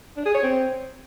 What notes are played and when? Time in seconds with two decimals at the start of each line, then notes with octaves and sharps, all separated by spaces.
0.17 D4
0.26 G#4
0.35 C#5
0.43 C4